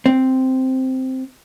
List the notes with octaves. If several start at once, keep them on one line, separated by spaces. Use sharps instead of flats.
C4